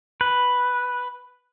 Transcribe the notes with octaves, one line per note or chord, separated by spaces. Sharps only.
B4